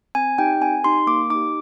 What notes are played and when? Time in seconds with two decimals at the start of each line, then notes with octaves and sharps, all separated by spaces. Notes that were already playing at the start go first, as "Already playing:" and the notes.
0.15 C4 G#5
0.38 D#4 G4 G5
0.61 C4 G#5
0.84 D#4 G4 C6
1.07 A#3 D6
1.30 D#4 G4 D6